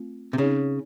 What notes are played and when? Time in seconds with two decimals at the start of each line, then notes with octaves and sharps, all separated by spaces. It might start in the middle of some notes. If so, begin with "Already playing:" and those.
Already playing: A3 C4 F4
0.33 C3
0.38 C#3 C4 D#4 G#4 C#5